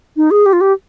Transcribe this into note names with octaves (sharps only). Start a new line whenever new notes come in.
D#4
G#4
G4
F4
G4